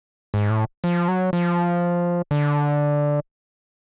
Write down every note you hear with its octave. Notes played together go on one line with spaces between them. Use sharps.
G#2
A2
F3
F#3
F3
D3